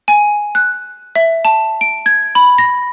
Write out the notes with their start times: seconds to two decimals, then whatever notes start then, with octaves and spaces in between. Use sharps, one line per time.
0.08 G#5
0.55 F#6
1.16 E5
1.45 A5
1.81 D7
2.06 G#6
2.35 B5
2.58 A#6